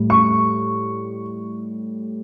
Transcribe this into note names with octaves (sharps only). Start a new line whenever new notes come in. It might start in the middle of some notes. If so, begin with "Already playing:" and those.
Already playing: A2 G3
C#6